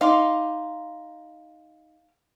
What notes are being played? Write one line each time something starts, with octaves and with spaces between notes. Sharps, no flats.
D#4 F5 C6 D6